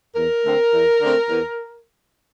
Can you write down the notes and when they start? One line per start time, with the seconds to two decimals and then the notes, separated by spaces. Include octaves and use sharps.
0.15 E2 A#4
0.44 D3 A3 C4
0.73 E2
1.01 D3 A3 C4
1.29 E2